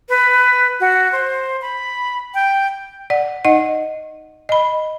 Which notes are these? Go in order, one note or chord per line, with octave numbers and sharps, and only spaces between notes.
B4
F#4
C5
B5
G5
D5 F#5
D#4 D#5 F#5
D#5 B5